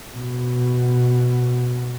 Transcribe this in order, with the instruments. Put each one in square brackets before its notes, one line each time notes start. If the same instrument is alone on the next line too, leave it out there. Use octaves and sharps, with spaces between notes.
[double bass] B2